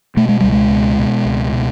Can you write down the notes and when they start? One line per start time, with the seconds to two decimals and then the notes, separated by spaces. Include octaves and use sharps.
0.17 B2 A3
0.29 G#3
0.41 C#2 G3
0.52 G#3
0.71 B2
0.98 B2
1.25 C#2
1.53 B2